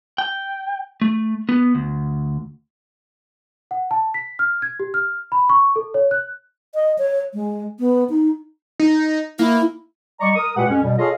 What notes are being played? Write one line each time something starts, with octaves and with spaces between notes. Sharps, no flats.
G5
A3
B3
D2
F#5
A5
B6
F6
G#6
G4
F6
B5
C#6
A4
C#5
F#6
D#5
C#5
G#3
B3
D#4
D#4
A#3 E4
G3 D5 D#5 A#5 C#6
A#4 D#6
A#2 G#3 F#4 G4 B4 F#5
F2 C#4
B2 G3
F4 G#4 A4 C#5 D#5 F5